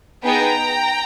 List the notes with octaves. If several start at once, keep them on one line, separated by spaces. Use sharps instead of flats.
B3 D#4 G#4 G5 A#5